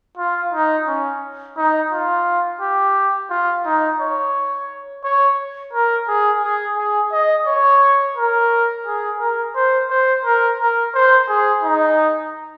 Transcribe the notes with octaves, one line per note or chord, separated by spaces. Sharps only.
F4
D#4
C#4
D#4
F4
G4
F4
D#4
C#5
C#5
A#4
G#4
G#4
G#4
D#5
C#5
A#4
G#4
A#4
C5
C5
A#4
A#4
C5
G#4
D#4